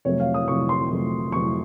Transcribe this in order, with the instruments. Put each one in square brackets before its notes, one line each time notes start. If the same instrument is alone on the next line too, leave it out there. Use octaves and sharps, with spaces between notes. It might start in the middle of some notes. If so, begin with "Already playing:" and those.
[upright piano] F2 C3 F#3 A3 C#5
F5
D#6
F2 C3 F#3 A3 C#6
C6
F2 C3 F#3 A3
F2 C3 F#3 A3 C#6